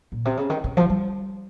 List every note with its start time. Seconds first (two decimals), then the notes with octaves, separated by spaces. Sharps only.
0.12 A#2
0.25 C3
0.37 C#3
0.50 D#3
0.64 C#3
0.77 F3
0.90 G3